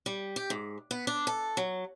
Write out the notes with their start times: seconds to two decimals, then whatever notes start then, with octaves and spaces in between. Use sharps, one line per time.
0.06 G3
0.36 G4
0.50 G#2
0.91 B3
1.07 D4
1.27 A4
1.57 F#3